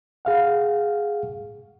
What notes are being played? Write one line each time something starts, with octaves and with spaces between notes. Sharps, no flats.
G#4 F5 F#5